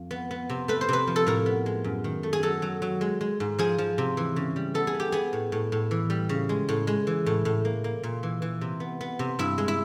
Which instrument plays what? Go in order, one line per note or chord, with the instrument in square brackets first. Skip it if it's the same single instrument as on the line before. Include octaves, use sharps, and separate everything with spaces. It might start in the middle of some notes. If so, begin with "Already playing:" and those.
Already playing: [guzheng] F2
B3
B3
C3
A3 B4
C5
C3 B4
F3
A4
A2 A#4
B3
G#3
F#2
D#3
A3
G#4
F#3 A4
F#3
F#3
G#3
G#3
G#2
F3 G#4
F3
C3
E3
C#3
G3
B3 A4
G#4
B3
G4
B3 G#4
A2
A2
A2
E3
G3
C#3
G#3
A2
G#3
E3
A2
A2
A#3
A#3
A#2
E3
E3
C3
B3
B3
C3
G2 E4
G#3
E4